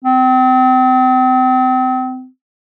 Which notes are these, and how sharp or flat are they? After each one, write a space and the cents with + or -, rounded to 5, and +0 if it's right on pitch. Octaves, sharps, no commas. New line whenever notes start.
C4 -35